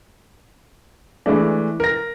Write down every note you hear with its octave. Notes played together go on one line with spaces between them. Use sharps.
E3 G#3 A3 D4
A#4 A#6